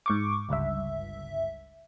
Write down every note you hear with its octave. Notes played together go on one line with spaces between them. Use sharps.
G#2 C#6 D6
G1 C#2 G2 E5